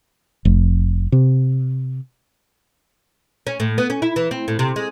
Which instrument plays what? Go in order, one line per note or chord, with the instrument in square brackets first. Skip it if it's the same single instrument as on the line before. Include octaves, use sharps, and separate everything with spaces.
[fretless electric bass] F1
C3
[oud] C#4
A2
B3
C#4
E4
E3
C4
A2
C3
G#3